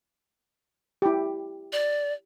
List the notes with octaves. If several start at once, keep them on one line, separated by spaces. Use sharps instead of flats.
E4 G4
D5